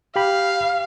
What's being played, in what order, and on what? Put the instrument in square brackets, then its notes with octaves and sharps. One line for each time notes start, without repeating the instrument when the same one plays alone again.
[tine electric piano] G4 G5 B5 [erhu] F5